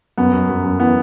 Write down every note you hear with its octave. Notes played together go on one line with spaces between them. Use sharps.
F#2 B3
F#2
F#2
F#2
E3 B3